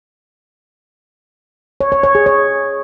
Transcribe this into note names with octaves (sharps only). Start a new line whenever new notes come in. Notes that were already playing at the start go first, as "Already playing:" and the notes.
C#5
C#5
C#5
G#4
C#5